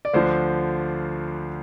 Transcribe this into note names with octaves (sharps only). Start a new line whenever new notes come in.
D5
D2 D3 F3 C5